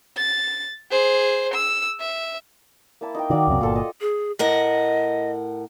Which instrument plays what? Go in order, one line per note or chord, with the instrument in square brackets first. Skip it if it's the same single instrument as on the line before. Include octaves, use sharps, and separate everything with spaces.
[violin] A6
G#4 C5
E6
E5
[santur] A#3 E4 A5
D#4 A#4 G5
[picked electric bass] D3 D#3 [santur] F#4 D5 F5
[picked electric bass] C#2 F#2 C3
[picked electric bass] G1 A#2 [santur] F4 A4 A5
[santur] D#5
[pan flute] G#4
[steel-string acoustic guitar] A2 A#4 F#5 [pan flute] D#5